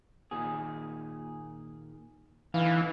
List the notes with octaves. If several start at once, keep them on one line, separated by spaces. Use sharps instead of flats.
A#2 D#3 G#4
D3 E3 D#4 F5